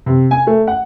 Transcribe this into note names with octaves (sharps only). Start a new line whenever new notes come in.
C3
G#5
A3
F#5